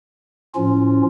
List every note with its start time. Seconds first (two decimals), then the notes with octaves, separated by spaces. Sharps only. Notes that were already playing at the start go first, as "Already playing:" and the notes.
0.54 A2 F3 C#4 F4